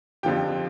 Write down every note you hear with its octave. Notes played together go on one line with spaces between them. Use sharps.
F2 D3 F3 G4 G5